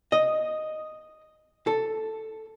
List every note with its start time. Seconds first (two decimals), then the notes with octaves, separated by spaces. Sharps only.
0.12 D#5
1.67 A4